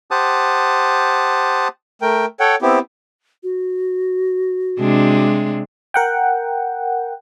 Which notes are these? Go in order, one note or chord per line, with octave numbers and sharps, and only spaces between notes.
G4 C5 F#5 A5 D#6
A3 A#4 G5
A4 C#5 F#5 G5
B3 C4 E4 G4
F#4
C3 G#3 D4
A#4 F#5 G5